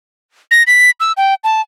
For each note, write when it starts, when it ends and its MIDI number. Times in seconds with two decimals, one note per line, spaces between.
0.51 0.63 94
0.67 0.90 95
1.00 1.12 88
1.17 1.34 79
1.44 1.61 81